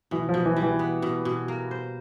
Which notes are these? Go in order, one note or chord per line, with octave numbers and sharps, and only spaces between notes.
B2 E3
F3
B2
E3
G3
E3
B3
B2
B2
A#3
C5